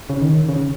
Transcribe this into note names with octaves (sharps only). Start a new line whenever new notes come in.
C#3
D#3
C#3